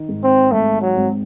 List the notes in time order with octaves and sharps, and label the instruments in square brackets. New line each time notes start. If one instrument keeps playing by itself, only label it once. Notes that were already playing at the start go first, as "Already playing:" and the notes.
Already playing: [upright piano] D#3
G#2
[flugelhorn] C4
[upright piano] G#1 [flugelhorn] A3
[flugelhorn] F#3
[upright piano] G#1